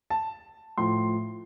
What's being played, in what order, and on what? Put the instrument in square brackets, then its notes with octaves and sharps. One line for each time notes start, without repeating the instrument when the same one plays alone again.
[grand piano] A5
A2 F3 C6